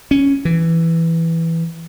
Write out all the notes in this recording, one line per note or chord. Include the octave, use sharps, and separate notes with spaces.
C#4
E3